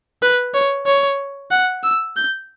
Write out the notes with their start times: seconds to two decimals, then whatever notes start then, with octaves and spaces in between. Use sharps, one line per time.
0.22 B4
0.54 C#5
0.86 C#5
1.51 F#5
1.84 E6
2.17 G6